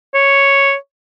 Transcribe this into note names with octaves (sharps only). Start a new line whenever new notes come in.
C#5